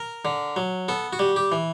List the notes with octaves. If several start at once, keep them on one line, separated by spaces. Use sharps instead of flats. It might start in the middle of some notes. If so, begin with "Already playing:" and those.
Already playing: A#4
D3
F#3
B3 A4
F#4
G3
G4
E3